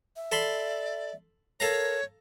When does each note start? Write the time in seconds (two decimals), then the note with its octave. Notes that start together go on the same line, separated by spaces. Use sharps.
0.16 E5
0.32 A4 D5 B5 C6
1.60 A4 A#4 C#5 F5 A#5